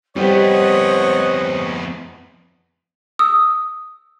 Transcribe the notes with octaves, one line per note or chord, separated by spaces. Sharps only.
F2 G3 B3 G4 C5 C#5 D#5 F#5
D#6 E6